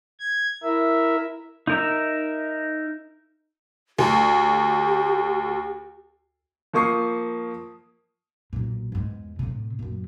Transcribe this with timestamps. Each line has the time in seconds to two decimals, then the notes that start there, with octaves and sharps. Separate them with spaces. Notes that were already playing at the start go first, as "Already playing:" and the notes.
0.20 G#6
0.63 E4 A#4 E5
1.67 D#4 A#4 E5
3.98 D2 G4
6.73 F3 A#3 C#6 D#6 C7
8.53 B1 A#2
8.92 E2 G#2
9.39 A2 C3
9.79 F#2 A#2